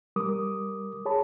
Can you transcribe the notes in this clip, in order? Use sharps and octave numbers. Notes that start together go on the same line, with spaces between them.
G3 A#4 D6 D#6
G#4 C#5 A5 B5